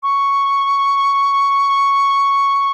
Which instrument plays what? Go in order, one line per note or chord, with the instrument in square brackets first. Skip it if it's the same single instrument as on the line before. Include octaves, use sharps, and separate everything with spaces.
[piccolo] C#6